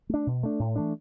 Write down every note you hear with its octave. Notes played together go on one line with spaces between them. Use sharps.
A3 D4
B2
A3 D4
A2
E3 A3 D4